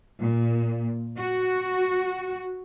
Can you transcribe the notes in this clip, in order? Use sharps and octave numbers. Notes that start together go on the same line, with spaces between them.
A#2
F#4